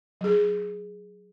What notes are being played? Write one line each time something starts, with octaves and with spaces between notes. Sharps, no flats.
F#3 G#4